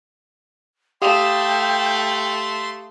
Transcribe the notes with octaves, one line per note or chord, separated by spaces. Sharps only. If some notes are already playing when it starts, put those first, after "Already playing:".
A3 G4 F5 G5 C6 D#6